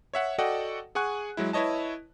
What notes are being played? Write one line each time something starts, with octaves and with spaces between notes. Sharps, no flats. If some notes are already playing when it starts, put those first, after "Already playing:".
C#5 E5 F#5
F#4 A4 D5 D#5 F#5 G5
G#4 F#5 G#5 C#6 F#6
F#3 G#3 E4
E4 B4 C#5 D#5 A5